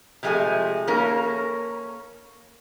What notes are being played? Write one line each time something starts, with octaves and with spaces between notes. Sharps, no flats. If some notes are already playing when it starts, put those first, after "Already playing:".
C3 F3 G#3 A3 G#5
A#3 C#4 A4 A#4